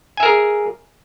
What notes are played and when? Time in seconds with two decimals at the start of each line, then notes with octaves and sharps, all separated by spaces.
0.17 G#5
0.20 E5
0.23 A#4
0.26 G#4